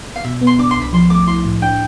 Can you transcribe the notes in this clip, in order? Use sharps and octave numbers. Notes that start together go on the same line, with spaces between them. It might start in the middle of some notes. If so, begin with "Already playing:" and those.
F5
B2 E5
B3
C6
D4 D6
C6
C2
B5
F3 C6
A3 D6
E4 C6
A2
D4 G5